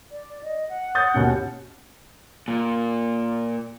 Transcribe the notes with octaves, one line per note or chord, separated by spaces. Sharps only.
D5
D#5
F#5
D#6 G6 A6
D#2 B2 C#4
A#2